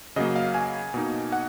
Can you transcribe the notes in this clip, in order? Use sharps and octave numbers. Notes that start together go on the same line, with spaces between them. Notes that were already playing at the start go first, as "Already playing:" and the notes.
C#3 F#3 A#3 D#5
F5
G#5
B2 A#3 D#4
F#5